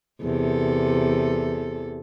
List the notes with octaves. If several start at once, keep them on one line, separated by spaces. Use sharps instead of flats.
E2 C3 A4